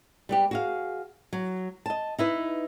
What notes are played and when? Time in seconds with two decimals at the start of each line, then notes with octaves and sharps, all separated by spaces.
0.29 G3 B3 G4
0.51 F#4 G#4 F5
1.33 F#3
1.86 D#5 A5
2.18 D#4 E4 B4